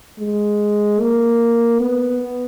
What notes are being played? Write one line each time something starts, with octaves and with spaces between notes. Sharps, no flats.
G#3
A#3
B3